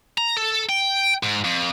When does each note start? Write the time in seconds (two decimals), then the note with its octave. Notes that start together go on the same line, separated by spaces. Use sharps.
0.18 A#5
0.37 A4
0.69 G5
1.23 G#2
1.45 F2